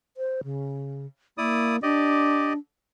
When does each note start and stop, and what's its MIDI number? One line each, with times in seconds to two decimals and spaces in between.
0.17 0.41 72
0.44 1.06 49
1.38 1.82 58
1.38 1.76 64
1.38 1.76 74
1.38 1.76 87
1.83 2.57 62
1.83 2.53 67
1.83 2.53 74
1.83 2.53 75